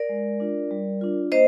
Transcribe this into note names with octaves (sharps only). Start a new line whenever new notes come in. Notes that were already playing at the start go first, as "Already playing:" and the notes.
Already playing: A#4 D5
G#3
D4 F4
G3
D4 F4
A#3 C5 D#5